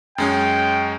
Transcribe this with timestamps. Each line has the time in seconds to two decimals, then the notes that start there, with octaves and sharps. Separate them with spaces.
0.18 F#2 G#3 C#4 G5